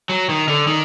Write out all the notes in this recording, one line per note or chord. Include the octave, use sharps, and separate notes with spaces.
F#3
D#3
D3
D#3